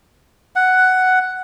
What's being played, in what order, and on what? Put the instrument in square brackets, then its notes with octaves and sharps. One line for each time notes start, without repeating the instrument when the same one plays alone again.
[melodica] F#5